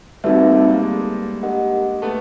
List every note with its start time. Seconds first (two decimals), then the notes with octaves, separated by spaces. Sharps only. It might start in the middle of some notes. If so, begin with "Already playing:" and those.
0.24 G3 A3 C4 D#4 F#4 B4 E5
0.38 G#3 A#3
0.53 G3 A3
0.68 G#3 A#3
0.83 G#3 A#3
1.43 D4 G4 A#4 D#5 F#5
2.02 A3 B3